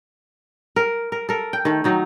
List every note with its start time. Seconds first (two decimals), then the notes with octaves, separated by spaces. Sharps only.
0.76 A#4
1.12 A#4
1.29 A4 A#4
1.53 G5
1.65 D#3 A3
1.84 D#3 F#3 D#4